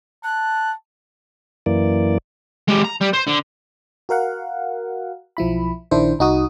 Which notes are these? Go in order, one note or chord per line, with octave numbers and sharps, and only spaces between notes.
A5 F#6
F#2 E3 A#3 D5
G#3 G4
A#5
G3
C5
D3
F#4 A#4 F5 F#5
B1 F3 E4 B5
A#1 D#3 D4 E4 C5
C2 D#4 F#4 D#6